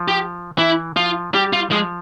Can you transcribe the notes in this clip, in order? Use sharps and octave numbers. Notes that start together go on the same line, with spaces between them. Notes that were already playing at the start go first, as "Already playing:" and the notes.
Already playing: F3
G4
E3 E4
F3 F4
G3 G4
F4
F3 G#3